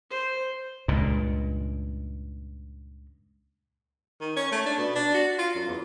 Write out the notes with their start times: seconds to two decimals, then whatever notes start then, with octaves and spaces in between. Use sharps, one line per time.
0.10 C5
0.88 C#2 G2 A#2
4.21 D#3
4.36 C#4
4.52 A3
4.66 D4
4.78 B2
4.95 D4
5.14 F#4
5.38 F4
5.55 F#2
5.68 E2